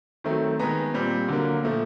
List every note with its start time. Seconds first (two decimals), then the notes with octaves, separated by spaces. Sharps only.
0.24 D#3 F#3 A3 C4
0.59 D#3 G#3 B3 A#5
0.94 A#2 G3 C4
1.28 D3 F#3 A#3
1.63 A#2 F3 A3